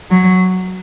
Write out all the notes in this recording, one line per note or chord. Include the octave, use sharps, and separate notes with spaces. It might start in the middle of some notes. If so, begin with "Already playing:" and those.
F#3